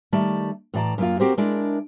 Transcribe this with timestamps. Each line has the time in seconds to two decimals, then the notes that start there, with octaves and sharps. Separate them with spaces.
0.12 D#3 G3 A3 D5 A5
0.74 A2 E3 D5 A5 A#5
0.98 F#2 A#3 F4
1.20 C4 F#4 G4 A#4 C5
1.37 G#3 D4 E4 A#4 D5